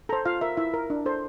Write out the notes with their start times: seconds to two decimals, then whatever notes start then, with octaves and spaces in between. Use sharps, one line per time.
0.09 A4 C5 A#5
0.26 F4 F5
0.41 A#4 E5
0.57 E4 E5
0.74 A#4
0.90 D4
1.06 A4 C5